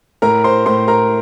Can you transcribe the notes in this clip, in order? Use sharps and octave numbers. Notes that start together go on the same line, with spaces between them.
A2 A#4 A#5
C5 C6
A2 C5 C6
A#4 A#5